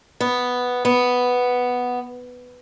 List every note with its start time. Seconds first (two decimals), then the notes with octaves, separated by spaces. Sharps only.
0.21 B3
0.85 B3